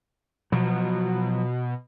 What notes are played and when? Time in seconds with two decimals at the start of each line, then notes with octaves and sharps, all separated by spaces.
0.52 B2 F3 F#3